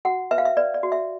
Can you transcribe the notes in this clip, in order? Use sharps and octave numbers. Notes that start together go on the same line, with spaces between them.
F#4 F#5
B4 E5
F5
E5
B4 D5
D5
F#4
E5